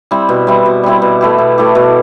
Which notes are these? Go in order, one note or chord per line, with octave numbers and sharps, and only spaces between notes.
G3 C4 E4
B2
G3 C4 E4
B2
G3 C4 E4
B2
A3 E4 G4
B2
A3 E4 G4
B2